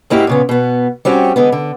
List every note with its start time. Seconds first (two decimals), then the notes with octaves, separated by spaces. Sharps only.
0.10 G#2 A#3 E4 F#4 G4
0.27 A#2 C#3 B3
0.49 B2 B3
1.05 G3 C4 C#4 F#4
1.36 D3 G#3 B3
1.52 D3